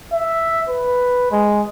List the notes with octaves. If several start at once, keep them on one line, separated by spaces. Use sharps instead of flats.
E5
B4
G#3